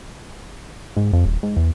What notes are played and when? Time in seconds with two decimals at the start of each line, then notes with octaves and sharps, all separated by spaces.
0.97 G#2
1.13 F2
1.26 D#1
1.43 G#2
1.57 E2